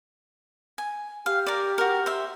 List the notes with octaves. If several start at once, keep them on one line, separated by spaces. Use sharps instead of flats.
G#5
G4 F5
A#4 D5
F#4 A#4
C5 E5